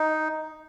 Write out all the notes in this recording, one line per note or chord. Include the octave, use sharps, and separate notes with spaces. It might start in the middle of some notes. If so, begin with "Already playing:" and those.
Already playing: D#4